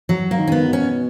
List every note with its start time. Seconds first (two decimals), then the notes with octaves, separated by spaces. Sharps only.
0.09 F#3
0.31 A#3
0.38 D#3
0.47 C#4
0.52 B3
0.66 B2
0.73 C#4